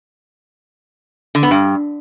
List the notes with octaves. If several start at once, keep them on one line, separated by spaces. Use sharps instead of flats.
D3
B3
G2